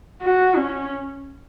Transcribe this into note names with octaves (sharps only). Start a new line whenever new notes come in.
F#4
C#4